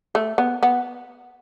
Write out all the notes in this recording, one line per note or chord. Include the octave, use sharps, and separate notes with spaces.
A3
B3
B3